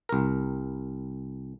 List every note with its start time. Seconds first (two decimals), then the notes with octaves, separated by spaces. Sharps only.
0.09 C2 A#4